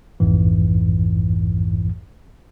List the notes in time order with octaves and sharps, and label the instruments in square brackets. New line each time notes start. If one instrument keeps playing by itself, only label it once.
[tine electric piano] A#1 F2 G#2 E3